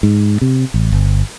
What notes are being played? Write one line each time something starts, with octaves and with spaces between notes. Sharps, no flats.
G#2
C3
A1
G1